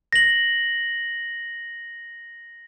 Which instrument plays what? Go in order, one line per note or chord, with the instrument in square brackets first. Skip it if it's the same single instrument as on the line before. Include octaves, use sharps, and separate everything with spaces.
[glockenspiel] A#6 F#7